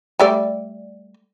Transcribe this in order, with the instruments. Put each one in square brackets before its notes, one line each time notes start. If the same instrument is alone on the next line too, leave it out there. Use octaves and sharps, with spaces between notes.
[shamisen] G3 A3 D5